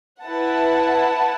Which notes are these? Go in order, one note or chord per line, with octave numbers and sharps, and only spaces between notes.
E4 B4 F#5 A5